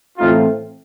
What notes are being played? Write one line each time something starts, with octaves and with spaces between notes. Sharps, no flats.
A2 E3 A3 C4 D#4 F4